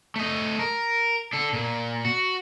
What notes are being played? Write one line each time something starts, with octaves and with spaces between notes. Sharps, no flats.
A3 D#5
A#4
D4 A4
A#2
F#4